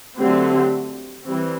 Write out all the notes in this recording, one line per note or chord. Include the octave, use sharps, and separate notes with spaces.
D3 F#3 A3 C4 G4
E3 G3 C4